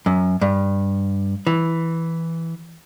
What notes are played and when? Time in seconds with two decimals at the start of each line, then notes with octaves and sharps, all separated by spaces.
0.06 F#2
0.42 G2
1.47 E3